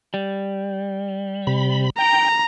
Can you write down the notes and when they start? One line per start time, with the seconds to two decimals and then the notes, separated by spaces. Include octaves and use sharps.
0.14 G3
1.47 C3 B5
1.98 G5 A#5